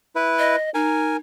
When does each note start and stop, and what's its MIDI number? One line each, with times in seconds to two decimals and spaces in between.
0.16 0.56 64
0.16 0.56 71
0.39 0.70 75
0.74 1.16 63
0.74 1.17 70
0.74 1.17 80